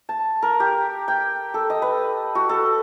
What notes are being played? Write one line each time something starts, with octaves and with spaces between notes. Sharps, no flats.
A5
A#4
G4
G5
A4
D#5
B4
F#4
A4